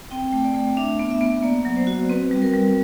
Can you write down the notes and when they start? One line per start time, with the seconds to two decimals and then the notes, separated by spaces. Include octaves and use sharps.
0.11 C4 G5
0.33 A3
0.44 D5
0.55 A3
0.77 D4 E5
0.99 B3
1.11 E5
1.21 B3
1.43 A#3 D5
1.65 F#3
1.76 C5
1.87 F#4
2.09 C4 B4
2.31 G3
2.42 A#4
2.53 G3